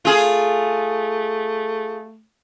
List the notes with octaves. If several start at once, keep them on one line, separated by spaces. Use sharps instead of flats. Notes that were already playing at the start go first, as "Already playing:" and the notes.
A3 F4 G#4